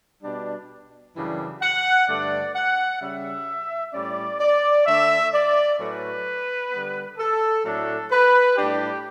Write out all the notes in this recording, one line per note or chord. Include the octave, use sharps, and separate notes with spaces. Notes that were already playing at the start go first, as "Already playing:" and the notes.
B2 G3 D4
F#2 C#3 E3 G3 D4
F#5
G2 D3 A3 D4 D5
F#5
C#3 G3 C#4 E5
A2 G3 C#4 D5
D5
D3 A3 D4 E5
D5
A2 F#3 A3 C#4 B4
D3 G3 B3
A4
A2 F#3 A3 D4 A4
B4
A2 G3 D4 G4